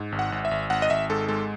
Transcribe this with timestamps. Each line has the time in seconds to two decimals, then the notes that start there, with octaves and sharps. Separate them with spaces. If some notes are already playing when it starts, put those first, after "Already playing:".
Already playing: G#2
0.12 G#1
0.19 F#5
0.32 G#1
0.45 E5
0.51 G#1
0.70 G#1 F#5
0.82 D#5
0.90 G#1 E5
1.10 G#2 A4
1.28 G#3 A4